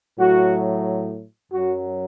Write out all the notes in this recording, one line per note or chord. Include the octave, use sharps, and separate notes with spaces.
A2 F#3 F#4
F#2 F#3 F#4